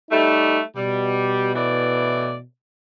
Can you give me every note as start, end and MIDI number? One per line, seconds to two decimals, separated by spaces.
0.11 0.60 55
0.11 0.60 57
0.11 0.61 63
0.76 2.45 47
0.76 1.49 55
1.55 2.32 45
1.55 2.32 52
1.55 2.32 74